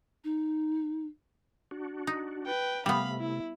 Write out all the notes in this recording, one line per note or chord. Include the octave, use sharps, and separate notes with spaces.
D#4
D4 F#4
D#4
B4 G5
C3 G3 A3 B3 F5 B5
E4